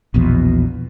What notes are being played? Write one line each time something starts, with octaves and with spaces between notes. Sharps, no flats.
A#1 E2 B2